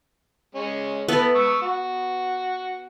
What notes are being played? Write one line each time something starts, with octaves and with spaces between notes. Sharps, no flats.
G#3 C#4
B3 E4 A4
C#6 E6
F#4